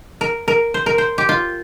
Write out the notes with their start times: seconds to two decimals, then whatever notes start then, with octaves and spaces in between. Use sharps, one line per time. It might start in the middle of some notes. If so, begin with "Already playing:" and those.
0.21 A#4
0.48 A#4
0.74 C5
0.86 A#4
0.98 C5
1.18 G4
1.29 F4